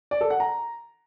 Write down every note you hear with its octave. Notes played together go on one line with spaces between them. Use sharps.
D5
A4
F#5
A#5